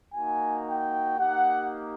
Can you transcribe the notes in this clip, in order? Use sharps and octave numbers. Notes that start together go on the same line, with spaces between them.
A#3 D#4 F#4 G#5
G5
A#3 D#4 G4 F#5